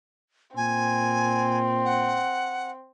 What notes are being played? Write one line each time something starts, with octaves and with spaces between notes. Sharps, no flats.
A#2 C4 G#5
F#5